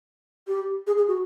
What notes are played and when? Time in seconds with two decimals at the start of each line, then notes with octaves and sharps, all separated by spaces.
0.48 G4
0.87 G#4
0.97 G#4
1.08 F#4